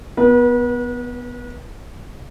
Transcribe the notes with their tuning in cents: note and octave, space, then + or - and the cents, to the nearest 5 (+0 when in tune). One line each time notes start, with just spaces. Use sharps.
B3 +0 B4 -40